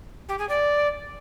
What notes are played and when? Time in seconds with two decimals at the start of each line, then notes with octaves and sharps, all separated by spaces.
0.29 G4
0.39 G#4
0.49 D5